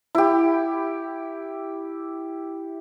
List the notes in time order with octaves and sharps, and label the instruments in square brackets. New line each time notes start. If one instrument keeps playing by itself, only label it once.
[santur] E4 G4